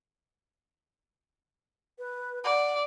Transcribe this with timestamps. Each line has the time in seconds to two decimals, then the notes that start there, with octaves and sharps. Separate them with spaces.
1.99 B4
2.44 D5 F#5